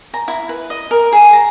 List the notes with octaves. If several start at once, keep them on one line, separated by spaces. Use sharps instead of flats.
A#5
E4
B4
D#5
A#4
G#4
A#5